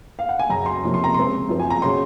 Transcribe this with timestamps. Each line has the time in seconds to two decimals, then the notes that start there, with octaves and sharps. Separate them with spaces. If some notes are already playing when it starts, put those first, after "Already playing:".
0.19 F5
0.29 F#5
0.39 G#5
0.49 F#2 C#3 F#3 A#5
0.66 C6
0.83 F2 C3 F3 A#3 C#4
0.94 C6
1.04 A#5
1.14 C#3 G#3 C4 C6
1.49 F#2 F3 C4
1.60 G#5
1.70 A#5
1.82 C#3 F#3 C#4 C6